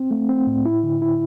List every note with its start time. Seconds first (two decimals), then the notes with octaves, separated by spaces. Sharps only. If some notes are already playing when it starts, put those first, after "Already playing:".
Already playing: C4
0.11 A3
0.29 C4
0.47 A2
0.65 E4
0.84 D3
1.02 E4